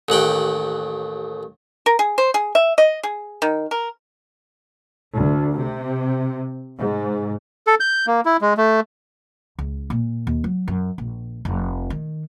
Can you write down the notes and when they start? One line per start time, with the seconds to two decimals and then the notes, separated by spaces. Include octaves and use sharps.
0.08 A1 D#2 F#5 G5
1.86 A#4
1.99 G#4
2.18 C5
2.34 G#4
2.55 E5
2.78 D#5
3.03 G#4
3.42 D#3
3.71 A#4
5.18 D2
5.57 C3
6.77 G#2
7.67 A4
7.80 G6
8.07 A#3
8.25 E4
8.42 G#3
8.57 A3
9.59 C#2
9.90 A#2
10.27 D#2
10.44 F#3
10.68 F#2
10.98 A#1
11.45 F1
11.90 D#3